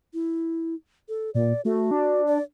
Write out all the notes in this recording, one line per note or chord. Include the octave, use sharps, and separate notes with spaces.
E4
A4
A#2 D5
A3 F#4
D4
D5